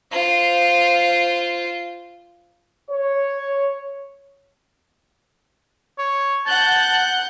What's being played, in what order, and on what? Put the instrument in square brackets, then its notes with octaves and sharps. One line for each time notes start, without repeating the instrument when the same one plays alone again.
[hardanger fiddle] F4 C5
[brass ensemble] C#5
[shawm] C#5
[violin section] F#5 F#6 G6 [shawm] A5